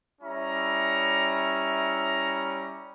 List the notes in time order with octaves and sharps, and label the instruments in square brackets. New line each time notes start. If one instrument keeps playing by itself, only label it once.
[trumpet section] G3 C#4 E4 A#5